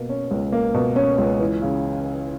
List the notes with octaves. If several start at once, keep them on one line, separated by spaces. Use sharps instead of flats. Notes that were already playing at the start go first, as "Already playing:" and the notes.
Already playing: B2 A#3
C#4
C#2
A#3
B2
C#4
C#2
E3
C#3